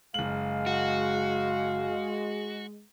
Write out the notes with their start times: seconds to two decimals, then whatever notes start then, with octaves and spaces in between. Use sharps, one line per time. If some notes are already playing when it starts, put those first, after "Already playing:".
0.14 F#1 G#3 F5 F#7
0.66 F#4